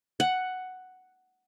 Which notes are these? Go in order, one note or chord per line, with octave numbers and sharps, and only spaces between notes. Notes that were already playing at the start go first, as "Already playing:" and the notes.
F#5